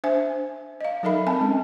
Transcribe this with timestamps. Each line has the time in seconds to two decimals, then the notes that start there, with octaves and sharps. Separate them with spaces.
0.04 D4 C5 E5 G#5
0.81 D#5 F5
1.03 F#3 D#4 A4 A#4 E5 B5
1.27 C4 G#5 A5
1.41 G#3 C#4